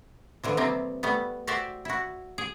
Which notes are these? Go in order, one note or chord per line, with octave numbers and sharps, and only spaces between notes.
D3 E3 F3
C3 E3 F3 G3 A#3 C4
G3 A3 B3
F#4 G4 C5 D5 E5
E4 F#4
G#4